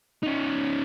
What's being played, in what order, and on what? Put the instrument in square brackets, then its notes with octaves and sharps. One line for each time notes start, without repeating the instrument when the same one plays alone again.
[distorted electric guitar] C#4 D#4